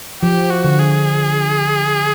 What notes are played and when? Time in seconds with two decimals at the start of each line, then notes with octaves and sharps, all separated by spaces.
0.22 F3 G4
0.50 F#4
0.64 D3
0.79 G#4